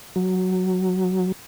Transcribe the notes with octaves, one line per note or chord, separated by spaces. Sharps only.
F#3